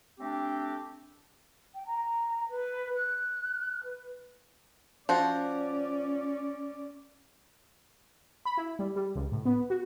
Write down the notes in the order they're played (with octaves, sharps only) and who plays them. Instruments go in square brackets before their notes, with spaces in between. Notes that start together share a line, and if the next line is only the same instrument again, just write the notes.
[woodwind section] A3 C4 D4 G4
[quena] G5
A#5
B4
F#6
B4
[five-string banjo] F3 F#4 [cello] C#4 D5
[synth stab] B5
E4
G3
G3
C#2
A2
B3
F#4